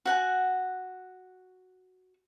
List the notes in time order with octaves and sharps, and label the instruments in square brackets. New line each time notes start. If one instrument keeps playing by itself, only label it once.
[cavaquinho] F#4 F#5 G#5